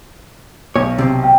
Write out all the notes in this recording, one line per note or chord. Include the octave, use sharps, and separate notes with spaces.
B1 C#5
C3 C4
G5